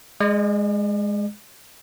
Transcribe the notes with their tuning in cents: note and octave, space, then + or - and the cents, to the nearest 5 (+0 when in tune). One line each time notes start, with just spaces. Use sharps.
G#3 +0 D5 +45